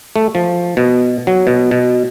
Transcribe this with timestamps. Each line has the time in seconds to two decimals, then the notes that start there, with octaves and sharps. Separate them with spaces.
0.16 A3
0.35 F3
0.77 B2
1.27 F#3
1.47 B2
1.71 B2